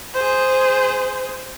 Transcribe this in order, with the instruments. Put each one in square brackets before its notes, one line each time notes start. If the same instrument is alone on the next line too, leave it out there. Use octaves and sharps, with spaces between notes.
[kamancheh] G#4 C5